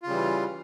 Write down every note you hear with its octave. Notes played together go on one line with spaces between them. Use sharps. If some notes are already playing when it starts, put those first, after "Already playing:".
C#3 E3 G3 F4